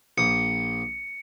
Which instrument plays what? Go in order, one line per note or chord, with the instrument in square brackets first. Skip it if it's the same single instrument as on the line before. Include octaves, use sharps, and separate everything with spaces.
[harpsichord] A#1 D#6 [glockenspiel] C#7